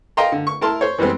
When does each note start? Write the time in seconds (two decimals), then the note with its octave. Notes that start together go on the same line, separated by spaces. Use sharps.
0.17 D#5 F5 G5 A#5 C6
0.32 D3
0.47 C#6
0.61 E4 A#4 A5 C6
0.81 C5 C#5
0.98 E3 G3 G#3 B3 C4